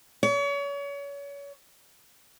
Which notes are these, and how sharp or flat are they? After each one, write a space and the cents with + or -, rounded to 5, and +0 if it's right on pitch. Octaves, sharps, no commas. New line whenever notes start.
C#5 +35